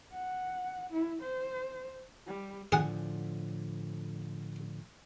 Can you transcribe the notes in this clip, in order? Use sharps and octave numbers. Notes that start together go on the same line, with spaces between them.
F#5
E4
C5
G3
A2 D3 F3 G#4 F#5